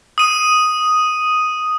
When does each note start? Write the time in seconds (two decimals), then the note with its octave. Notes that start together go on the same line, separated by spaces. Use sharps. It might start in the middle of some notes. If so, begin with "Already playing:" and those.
0.18 D#6 D#7